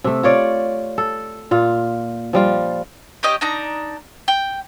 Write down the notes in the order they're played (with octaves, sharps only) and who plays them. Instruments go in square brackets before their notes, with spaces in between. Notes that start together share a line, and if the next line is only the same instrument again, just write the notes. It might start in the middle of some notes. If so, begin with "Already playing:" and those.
[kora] C3 A3
F4 C#5 D5
A4
A#2 F4
F3 G3 F4
[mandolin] C#4 G4 D#5
D4 D#4 A#5
G5